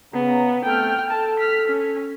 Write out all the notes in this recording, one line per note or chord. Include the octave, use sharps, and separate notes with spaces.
C#3 B3 A#5
A3 C4 A4 G5 F6
A4 A5
F6 B6
C#4